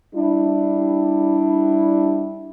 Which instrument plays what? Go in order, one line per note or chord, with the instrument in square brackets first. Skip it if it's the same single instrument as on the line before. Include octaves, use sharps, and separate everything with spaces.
[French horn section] G3 D4 E4